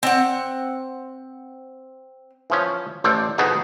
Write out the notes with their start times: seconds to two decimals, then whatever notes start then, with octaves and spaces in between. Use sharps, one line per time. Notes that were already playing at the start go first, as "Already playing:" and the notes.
0.03 C4 F#5
2.50 E3 F3 C#4
3.04 A1 A4 C5 D5
3.38 F2 B2 B3 D#4 G#4 A5